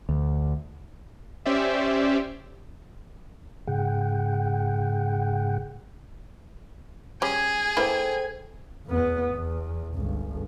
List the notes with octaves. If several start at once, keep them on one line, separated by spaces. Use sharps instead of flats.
D2
C#4 G4 C5 D5 E5
G#2 C#3 G#4 F#5 G5
G3 C#4 G#4 G#5 G#6
A#3 E4 A4 B4 C5 G5
E2 B3
E2
G1 C#2